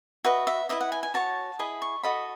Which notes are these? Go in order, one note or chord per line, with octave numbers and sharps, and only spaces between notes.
F#4 B4 D#5 E5
E5
E4 B4 D#5 E5
F#5
G#5
G#5
F#4 C#5 A5
E4 G#4 D#5 B5
C#6
F#4 A4 D#5 B5